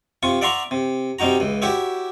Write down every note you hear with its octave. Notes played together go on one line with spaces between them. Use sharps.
C3 F4 C#6
D5 E5 F#5 A#5 C6 C#6
C3
C3 G3 D#4 F#4 A#5
C#2 E3
E4 F#4 G4 C#5 E5